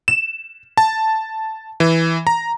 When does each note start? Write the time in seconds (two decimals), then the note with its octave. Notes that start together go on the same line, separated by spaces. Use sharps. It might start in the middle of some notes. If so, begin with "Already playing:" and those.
0.08 E7
0.77 A5
1.80 E3
2.27 A#5